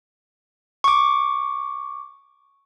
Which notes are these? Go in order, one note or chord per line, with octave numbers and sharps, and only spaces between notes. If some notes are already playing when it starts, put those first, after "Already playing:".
C#6 D6